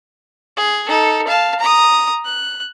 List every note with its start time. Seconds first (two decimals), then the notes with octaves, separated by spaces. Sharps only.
0.57 G#4
0.88 D#4 A4
1.27 F5 A5
1.60 A#5 D#6
2.25 F#6